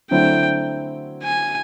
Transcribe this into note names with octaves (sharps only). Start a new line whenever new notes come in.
D3 F#3 A3 C4 E4 G5
G#5